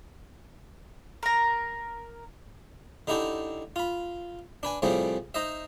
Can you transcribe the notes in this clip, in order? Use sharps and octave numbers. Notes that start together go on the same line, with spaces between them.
A#4 A#5
D3 D#4 E4 G4 A4
F4 B5
D4 B4 G#5
A2 C3 F3 G3 A3 G#4
D#4 C5 D#5 E5